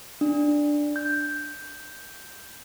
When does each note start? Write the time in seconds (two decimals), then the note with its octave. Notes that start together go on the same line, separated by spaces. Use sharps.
0.21 D4
0.96 G6